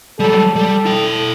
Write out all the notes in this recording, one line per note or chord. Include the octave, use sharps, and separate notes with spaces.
F#3 G3 A4
G3 A4
E4 G5